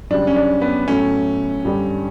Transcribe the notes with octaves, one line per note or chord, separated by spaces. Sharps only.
F#2 C#3 G3 D4
C#4
D4
B3
A2 F#3 A3 C#4
G2 D3 G3